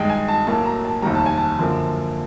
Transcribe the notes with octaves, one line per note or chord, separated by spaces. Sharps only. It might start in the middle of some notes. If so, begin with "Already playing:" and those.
Already playing: G2 D#3 G#3 G5
G#5
A5
B1 A2 F#3 A#3 A5
A#5
A5
F1 D#2 D#3 G3 A#5
A5
G#5
A5
F#2 D3 F3 A#3